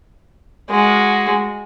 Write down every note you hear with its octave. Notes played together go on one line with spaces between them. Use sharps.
G#3 F#4